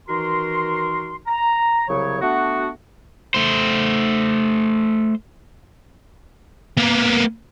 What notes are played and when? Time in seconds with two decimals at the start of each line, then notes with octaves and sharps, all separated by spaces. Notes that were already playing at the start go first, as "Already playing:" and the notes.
0.09 D#3 E3 F#4 A#4 C6
1.27 A#5
1.89 C2 C#3 F#3 C#5
2.22 A3 B3 D4 F#4
3.34 A3 C5
6.78 A#3 B3